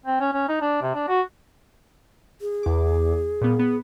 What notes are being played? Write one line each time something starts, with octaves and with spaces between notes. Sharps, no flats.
C4
C#4
C#4
D#4
D4
C3
D4
F#4
G#4
E2 D6
A#2 G3 B3
B3